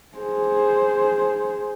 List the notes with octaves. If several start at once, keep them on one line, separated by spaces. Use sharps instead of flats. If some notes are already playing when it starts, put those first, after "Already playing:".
G#4 C5